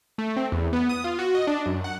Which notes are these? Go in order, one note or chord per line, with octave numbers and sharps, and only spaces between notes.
A3
C4
E2
B3
D#6
F4
F#4
D#5
D4
F#2
F#5